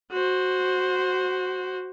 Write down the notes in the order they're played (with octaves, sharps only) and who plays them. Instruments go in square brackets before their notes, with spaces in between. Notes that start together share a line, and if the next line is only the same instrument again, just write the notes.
[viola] F#4 C5